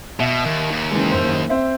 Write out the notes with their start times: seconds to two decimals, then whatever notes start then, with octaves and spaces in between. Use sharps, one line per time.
0.20 B2 E5
0.45 D#2
0.72 D#2
0.91 C#3 E3 G#3
1.12 F#1 C5
1.49 C4 C5 E5